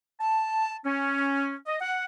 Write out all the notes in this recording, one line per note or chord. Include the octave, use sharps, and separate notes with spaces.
A5
C#4
D#5
F#5